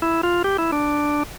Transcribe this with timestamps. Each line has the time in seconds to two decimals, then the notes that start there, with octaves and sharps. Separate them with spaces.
0.02 E4
0.23 F4
0.44 G4
0.58 E4
0.72 D4